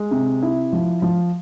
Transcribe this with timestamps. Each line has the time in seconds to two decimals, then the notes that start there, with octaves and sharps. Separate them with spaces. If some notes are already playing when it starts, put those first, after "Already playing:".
Already playing: G#3
0.11 C3
0.42 E4
0.73 F3
1.02 F3